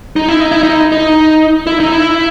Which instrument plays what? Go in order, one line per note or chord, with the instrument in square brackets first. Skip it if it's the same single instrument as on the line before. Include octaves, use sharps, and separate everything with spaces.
[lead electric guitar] D#4
E4
D#4
E4
D#4
D#4
E4
D#4
E4